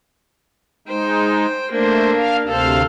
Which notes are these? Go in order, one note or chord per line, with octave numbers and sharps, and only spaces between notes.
G#3 D#4 C5 G5
A3 A#3 D4 C5
F5
D2 C3 A4 C5 F5